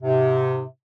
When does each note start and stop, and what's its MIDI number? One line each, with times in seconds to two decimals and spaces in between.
0.02 0.63 44
0.02 0.63 48